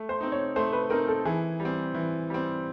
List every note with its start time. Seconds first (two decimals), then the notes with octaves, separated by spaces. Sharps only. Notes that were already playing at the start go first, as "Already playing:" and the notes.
Already playing: A3
0.09 C5
0.21 C4 D#4
0.32 C#5
0.56 A3 C5
0.73 B4
0.90 C4 D#4 A#4
1.08 A4
1.25 E3 G#4
1.60 G3
1.65 C4
1.94 E3
2.30 G3 C4